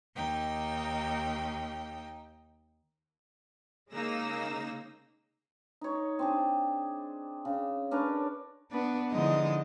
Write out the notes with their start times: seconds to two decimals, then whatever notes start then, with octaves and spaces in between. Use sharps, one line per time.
0.15 D#2 D#4 G5
3.91 C#3 G#3 A#3 D#4 E6 A#6
5.81 D#4 C#5
6.19 C4 D4 G#4
7.45 C#3
7.91 C#4 D4 A#4 B4
8.71 B3 D4 B4
9.11 D3 E3 F3 G#3 D#4 D#5